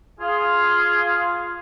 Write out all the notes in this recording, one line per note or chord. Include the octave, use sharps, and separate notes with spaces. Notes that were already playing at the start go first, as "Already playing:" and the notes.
F4 G#4